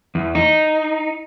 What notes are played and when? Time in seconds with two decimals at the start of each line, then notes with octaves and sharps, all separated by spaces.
0.15 E2
0.35 D#4